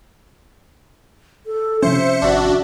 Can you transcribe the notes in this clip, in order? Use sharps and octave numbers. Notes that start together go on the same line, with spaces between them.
A4
C3 F3 C#4 C5 E5 C#7
G#1 D4 F#4